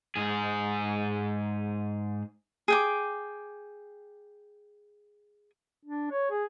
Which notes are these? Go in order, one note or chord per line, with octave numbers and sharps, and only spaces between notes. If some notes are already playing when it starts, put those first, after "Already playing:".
G#2 G#4
G#4 G5 D6
D4
C#5
G#4